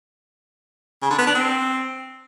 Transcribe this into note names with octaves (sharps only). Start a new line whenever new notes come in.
C#3
D3
B3
D4
C4